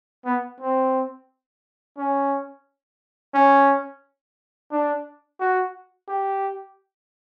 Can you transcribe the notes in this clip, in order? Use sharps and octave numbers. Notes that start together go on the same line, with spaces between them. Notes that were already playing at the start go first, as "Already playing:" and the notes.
B3
C4
C#4
C#4
D4
F#4
G4